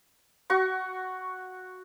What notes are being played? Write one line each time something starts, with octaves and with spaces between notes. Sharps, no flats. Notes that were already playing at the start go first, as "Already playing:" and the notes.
F#4 C#6